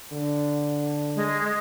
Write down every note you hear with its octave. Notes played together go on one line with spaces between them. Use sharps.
D3
G#3